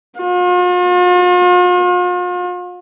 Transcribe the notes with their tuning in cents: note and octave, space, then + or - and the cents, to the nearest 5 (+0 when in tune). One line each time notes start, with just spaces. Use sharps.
F4 +45